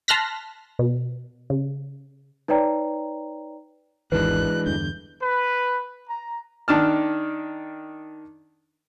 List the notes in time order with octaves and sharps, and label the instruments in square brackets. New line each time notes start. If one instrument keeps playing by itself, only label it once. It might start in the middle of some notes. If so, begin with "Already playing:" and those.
[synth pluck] A5 C6 F6 F#6 A#6 B6
B2
C#3
[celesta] D#4 B4 C#5 D5 G5 A#5
[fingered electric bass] G#1 E2 D#3 [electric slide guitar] E3 G#3 D4 [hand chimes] B4 [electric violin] F#6
[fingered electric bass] E2 G2 D3 [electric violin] G6
[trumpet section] B4
A#5
[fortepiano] D#3 D4 A5 F6